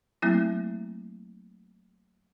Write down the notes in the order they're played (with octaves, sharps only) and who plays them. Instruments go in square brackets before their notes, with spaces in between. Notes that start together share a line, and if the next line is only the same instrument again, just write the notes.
[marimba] F#3 A3 A#3 C4 E4